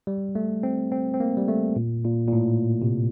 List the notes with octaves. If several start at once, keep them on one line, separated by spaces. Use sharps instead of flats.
G3
A3
C4
C4
C4
A#3
G3
A3
A#2
A#2
A#2
A2
C3